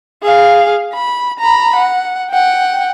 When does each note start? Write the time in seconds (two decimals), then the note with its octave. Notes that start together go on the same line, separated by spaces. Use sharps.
0.23 G#4 F5
0.94 B5
1.40 A#5 B5
1.76 F#5
2.31 F#5 G5